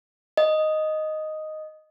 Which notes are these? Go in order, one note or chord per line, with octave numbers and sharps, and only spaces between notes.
D#5